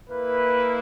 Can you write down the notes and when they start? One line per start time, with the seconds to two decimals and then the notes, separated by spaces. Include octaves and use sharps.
0.10 A#3 E4 B4